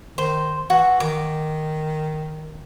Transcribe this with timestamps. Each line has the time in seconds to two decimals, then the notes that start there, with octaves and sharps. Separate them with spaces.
0.18 D#3 C5
0.70 E3 F#4
1.00 D#3 D6